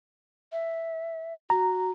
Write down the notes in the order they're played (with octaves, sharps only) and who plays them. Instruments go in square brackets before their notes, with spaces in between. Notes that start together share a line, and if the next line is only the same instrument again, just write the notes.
[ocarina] E5
[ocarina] F#4 [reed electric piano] A#5